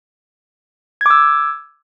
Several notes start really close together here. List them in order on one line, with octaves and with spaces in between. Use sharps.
G#6 D6 E6